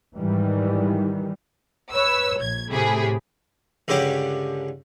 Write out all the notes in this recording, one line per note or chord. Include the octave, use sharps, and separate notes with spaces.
G#2 D#3 E3 G3
B4 C#5 E6
A#1 G#6
A2 C3 A3 G4 G#4 B5
C#2 G2 D3 C#4 G4 D6